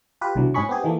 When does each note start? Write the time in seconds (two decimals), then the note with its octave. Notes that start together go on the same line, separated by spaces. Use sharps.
0.21 F4 G4 B4
0.35 C2 B2 D3 E3 F#3
0.54 G#2 G#3 C#4 G#4 B5 C#6
0.69 B3 C4 G4 G#4
0.84 D#3 E3 A3 A#3